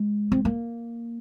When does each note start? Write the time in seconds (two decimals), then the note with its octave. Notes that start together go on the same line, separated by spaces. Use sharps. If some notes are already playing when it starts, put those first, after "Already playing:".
Already playing: G#3
0.32 C4
0.45 A#3